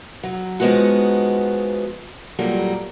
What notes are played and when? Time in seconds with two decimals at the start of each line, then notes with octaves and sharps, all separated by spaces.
0.23 F#3
0.60 F3 G#3 A#3 B3 D#4 F#4
2.39 A#2 F#3 G3 A4 A#4